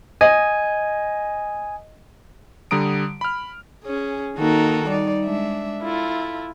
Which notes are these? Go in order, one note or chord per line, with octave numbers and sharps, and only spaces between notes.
D#5 G#5
D3 G3 A#5 D#6 D7
B5 F6
C#4 G#4
D#3 A#3 D#4 F#4 A4 A#4
G3 D#4 D5
G#3 D4 E5
E4 F4 A4